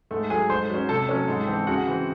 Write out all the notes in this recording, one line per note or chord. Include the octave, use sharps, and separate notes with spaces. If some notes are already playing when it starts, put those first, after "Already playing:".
G#2 A3 A4
F#3 A3 G#4 G#5
G#2 C5 C6
F#3 C#4
C3 A4 A5
F#3 A3 C#4
G#2
E3 C4
C#3 F#4 F#5
E3 C4